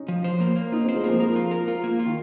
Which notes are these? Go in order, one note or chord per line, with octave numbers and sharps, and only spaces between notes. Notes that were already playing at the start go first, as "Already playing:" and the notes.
Already playing: C#4 D#4
F3
C5
A#3
A#3
D#4 F4
C4
C5
G#3
F3 A#3
A#4
F4
A#4
F4
A#3
F4
D#3